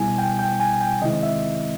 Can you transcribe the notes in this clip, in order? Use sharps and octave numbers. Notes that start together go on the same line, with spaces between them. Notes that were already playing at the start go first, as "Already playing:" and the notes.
Already playing: B2 G3 B3 E4 G#5
G5
G5
G#5
G5
C3 D#3 G#3 C4 E4 D#5
E5